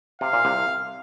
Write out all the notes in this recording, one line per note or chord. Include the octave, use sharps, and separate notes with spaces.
C3 F5
A#2
C2 C3